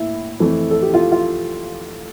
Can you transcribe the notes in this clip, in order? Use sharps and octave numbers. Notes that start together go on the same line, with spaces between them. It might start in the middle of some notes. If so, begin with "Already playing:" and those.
Already playing: A2 A#3 E4
F2 E3 A3
A4
G4
F4
F4